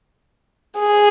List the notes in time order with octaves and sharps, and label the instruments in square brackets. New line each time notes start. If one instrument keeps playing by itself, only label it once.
[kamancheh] G#4